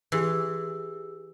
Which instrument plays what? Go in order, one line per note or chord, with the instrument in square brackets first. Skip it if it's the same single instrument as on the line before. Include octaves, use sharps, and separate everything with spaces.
[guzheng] E3 [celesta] G4 G#4 E6